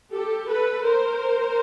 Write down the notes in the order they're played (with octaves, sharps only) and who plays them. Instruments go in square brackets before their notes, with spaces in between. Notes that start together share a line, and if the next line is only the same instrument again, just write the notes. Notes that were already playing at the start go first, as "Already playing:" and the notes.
[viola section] G4 A4
A4 B4
A#4 C5